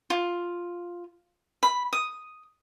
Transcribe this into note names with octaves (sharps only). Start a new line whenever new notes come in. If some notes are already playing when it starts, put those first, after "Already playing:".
F4
B5
D#6